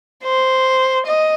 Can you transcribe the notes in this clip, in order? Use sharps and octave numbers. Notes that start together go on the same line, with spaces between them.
C5
D#5